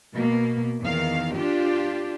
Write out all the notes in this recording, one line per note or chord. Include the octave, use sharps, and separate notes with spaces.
B2 A#3
E2 D#3 F5
D4 F4 G4